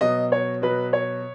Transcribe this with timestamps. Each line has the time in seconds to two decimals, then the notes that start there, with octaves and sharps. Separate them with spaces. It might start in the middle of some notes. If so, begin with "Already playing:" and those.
0.01 B2 F#3 D#5
0.32 C#5
0.62 B2 F#3 B4
0.93 C#5